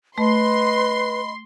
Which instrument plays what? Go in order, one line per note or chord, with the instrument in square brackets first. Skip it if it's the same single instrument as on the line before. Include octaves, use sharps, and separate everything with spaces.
[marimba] A3 [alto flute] B4 [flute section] D#5 B5 [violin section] C6